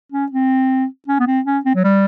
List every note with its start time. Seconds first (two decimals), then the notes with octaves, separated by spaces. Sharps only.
0.12 C#4
0.31 C4
1.08 C#4
1.19 B3
1.27 C4
1.45 C#4
1.65 C4
1.75 F#3
1.84 G3